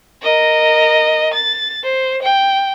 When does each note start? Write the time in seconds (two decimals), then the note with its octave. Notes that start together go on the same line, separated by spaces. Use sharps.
0.22 A#4 D#5
1.34 A6
1.83 C5
2.22 G5